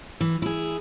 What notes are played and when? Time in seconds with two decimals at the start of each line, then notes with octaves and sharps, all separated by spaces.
0.21 E3
0.42 E4 G#4